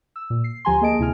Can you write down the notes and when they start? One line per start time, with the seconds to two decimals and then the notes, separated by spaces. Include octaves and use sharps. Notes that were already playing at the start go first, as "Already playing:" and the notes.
0.16 E6
0.30 A#2
0.44 C7
0.65 D2 F3 G4 G#5 A#5 C6
0.81 A#3 G#4 D#5 A5 D7
0.99 D2 C3 E4 G#5 F6